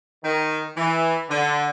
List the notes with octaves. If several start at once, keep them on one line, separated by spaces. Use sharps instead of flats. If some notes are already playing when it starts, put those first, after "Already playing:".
D#3
E3
D3